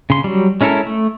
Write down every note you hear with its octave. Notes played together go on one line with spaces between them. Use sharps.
C#3 C6
F#3 G3
G#3 C#4 E4 A4 A#4
A3